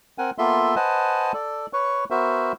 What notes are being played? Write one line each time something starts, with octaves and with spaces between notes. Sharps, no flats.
C4 A#4 F#5 G#5
A#3 B3 F4 A4 E5 C6
B4 C5 D#5 F#5 G#5 A5
A4 D5
B4 C#5 C#6
B3 F#4 A#4 C5 E5